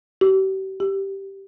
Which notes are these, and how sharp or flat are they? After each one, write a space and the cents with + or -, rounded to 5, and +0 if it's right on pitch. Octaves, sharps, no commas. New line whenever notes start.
G4 -40
G4 -5